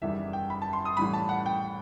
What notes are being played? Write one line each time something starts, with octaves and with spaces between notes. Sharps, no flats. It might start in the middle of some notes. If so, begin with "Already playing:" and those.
F#1 E2 D#3 G3 E5
G5
B5
A5
C6
D#6
A1 A2 E3 G3 B5
A5
F#5
G5